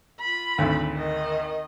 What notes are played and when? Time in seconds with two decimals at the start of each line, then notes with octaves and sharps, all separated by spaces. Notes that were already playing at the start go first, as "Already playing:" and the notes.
0.20 F4 B5
0.58 G#1 D2
0.96 D#3 D#5